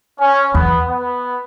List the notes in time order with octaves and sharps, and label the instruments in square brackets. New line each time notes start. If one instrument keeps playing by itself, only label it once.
[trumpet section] C#4
[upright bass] E2 [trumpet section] B3
[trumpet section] B3